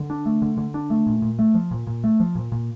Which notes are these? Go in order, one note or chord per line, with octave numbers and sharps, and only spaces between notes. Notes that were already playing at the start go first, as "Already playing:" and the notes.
Already playing: D3
D4
A3
D3
D3
D4
A3
A#2
A#2
A3
F3
A#2
A#2
A3
F3
A#2
A#2